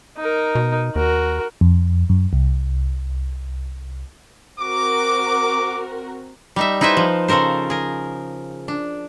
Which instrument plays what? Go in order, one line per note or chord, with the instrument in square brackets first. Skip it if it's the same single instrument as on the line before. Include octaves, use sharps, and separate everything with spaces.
[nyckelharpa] D#4 A#4
[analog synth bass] B2
[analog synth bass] D#2 [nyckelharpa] F#4 A#4
[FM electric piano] F2
F#2
C2
[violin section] C4 F#4 A#4 [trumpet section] D6
[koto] G3 D#4 E5
D#4 E4 B4 C5 E5
F3
C#3 F3 A4 A#4 C5
G#4 A#4
D4